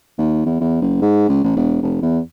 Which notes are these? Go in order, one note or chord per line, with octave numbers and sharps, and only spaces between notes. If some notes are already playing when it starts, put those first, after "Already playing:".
D#2
E2
E2
F#1
G#2
C#2
A1
E1
F1
E2